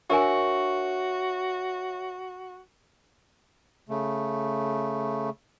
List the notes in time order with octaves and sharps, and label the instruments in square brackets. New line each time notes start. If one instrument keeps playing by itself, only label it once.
[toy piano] D4 A#4 G#5 [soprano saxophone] F#4 [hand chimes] C#5 E5 C#6
[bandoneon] C#3 A3